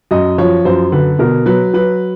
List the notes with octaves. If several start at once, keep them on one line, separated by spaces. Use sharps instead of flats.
F#2 D#5
F3 C#5
F#2 C5
D3 B4
B2 A#4
F#3 B4
F#3 B4